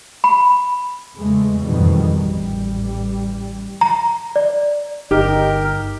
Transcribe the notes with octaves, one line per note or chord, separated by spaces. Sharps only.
B5
E2 C#3 G#3 A3
F2 G#2 B2 D#3 E3 G3
A1 G3
A#5
D5
G1 D#4 G4 A#4